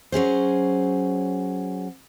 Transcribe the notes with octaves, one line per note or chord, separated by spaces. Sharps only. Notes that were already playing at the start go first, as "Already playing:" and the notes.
F#3 C#4 G#4 C5